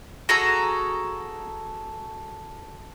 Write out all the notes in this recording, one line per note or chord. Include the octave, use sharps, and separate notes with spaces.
F#4 G#4 A4 A#5